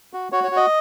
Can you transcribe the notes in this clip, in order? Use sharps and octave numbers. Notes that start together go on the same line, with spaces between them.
F#4
F#4 C#5
C#5
F#4
D#5